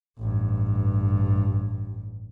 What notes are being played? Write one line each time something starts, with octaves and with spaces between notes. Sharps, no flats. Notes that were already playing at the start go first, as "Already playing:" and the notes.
A1 G2